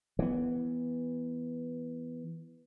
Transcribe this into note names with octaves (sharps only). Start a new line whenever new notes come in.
E3 B3